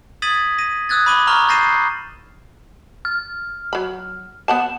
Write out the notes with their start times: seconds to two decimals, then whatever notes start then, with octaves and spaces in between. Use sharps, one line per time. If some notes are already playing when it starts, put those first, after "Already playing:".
0.22 D#6 G#6 A6 B6 D#7 F#7
0.58 A#6 D#7
0.89 D#6 E6 F#6 G#6 A6
1.06 B5 D6 D#7 G7
1.27 A#5 C#6 F6 F#7 G7
1.48 G6 A6 A#6 C7 D#7 E7
3.05 F6
3.73 F#3 B5
4.48 B3 F#5 A5 E7